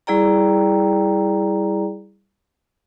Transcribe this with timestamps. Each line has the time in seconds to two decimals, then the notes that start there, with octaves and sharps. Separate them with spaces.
0.07 G3 E4 G#4 D5 G5 A#5